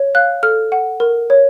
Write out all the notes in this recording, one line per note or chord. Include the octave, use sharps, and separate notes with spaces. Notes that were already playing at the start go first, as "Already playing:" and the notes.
Already playing: C#5
F5 F#6
A4 F6
F#5
A#4
C#5